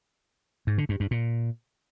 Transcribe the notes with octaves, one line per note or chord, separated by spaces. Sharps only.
G#2
D3
G2
G2
A#2